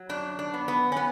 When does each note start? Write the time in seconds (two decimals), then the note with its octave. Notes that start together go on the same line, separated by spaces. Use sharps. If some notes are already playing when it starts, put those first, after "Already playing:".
Already playing: F#3
0.09 F#2 D4
0.39 D4
0.54 B3
0.68 B3
0.92 C#4
0.96 B3